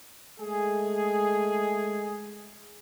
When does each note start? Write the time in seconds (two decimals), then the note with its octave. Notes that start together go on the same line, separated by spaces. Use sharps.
0.40 G#3 A3 G#4